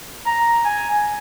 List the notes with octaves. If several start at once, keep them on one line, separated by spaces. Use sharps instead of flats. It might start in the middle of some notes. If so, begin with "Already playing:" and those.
A#5
G#5